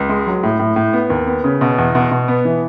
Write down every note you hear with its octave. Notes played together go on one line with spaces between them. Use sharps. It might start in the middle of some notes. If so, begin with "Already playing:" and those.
Already playing: C#2
G#3
F#3
A2
A2
A2
B3
D#2
B3
C#3
B2
E2
B2
B2
B3
E3